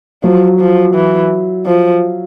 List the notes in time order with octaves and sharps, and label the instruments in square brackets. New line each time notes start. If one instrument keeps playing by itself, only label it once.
[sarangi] F3 [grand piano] F#3
[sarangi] F3
E3
F3